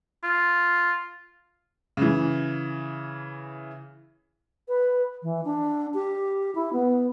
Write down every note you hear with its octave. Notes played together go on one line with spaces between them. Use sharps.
F4
C#3 E3
B4
E3
D4
G4
E4
B3